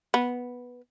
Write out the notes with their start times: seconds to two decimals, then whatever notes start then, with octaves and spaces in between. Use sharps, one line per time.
0.14 B3